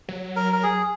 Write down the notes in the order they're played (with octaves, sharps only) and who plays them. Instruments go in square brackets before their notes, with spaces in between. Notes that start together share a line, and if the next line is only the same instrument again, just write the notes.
[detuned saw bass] F#3
[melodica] A#4
A#4
G#4